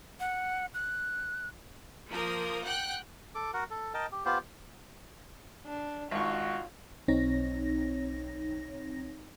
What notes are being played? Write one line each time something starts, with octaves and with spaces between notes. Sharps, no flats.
F#5
F#6
F3 A#3 A#4 D#6
F#5 G5 F#6 G6
A4 D6
F#4 A#4 F#5
A4
A#4 D#5 G5 A5
G4
B3 F4 G4 C5
D4
G#1 G#2 F4 F#4 C#6
B1 C4 D#4 C#5 A#6